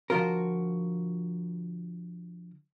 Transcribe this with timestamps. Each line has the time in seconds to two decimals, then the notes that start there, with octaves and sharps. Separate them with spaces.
0.10 D3 F3 F4 F#4 A#4